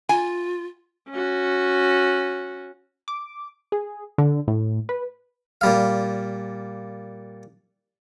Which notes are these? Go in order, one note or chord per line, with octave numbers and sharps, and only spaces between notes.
F4 G#5
C#4 F#4
D6
G#4
D3
A2
B4
A#2 G3 F5